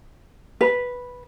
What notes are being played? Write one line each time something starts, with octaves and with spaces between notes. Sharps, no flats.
B4